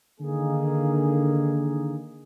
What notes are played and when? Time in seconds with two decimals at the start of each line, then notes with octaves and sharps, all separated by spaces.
0.21 D3 D#3 A#3 G#4